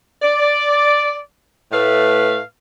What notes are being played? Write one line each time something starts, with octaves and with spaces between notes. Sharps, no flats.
D5
A2 A3 B4 F5